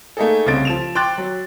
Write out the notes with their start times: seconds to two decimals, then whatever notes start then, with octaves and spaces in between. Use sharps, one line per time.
0.17 A3 A#3 D#4 G#4 A4
0.46 C2 C#3 C4 A6 D7
0.65 F3 E7 F7
0.95 G5 C6 D6 F#6 A6
1.18 F#3